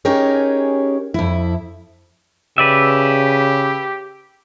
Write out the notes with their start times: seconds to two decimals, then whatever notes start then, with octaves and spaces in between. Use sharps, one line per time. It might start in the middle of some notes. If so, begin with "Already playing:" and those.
0.05 C#4 D#4 G4 G#4 A#4 C#5
1.14 F2 E4
2.58 C#3 G4 B4 D5 E5